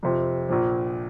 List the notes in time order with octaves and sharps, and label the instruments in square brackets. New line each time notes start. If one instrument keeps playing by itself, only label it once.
[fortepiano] F2 C3 F3
A#1 A#2 F3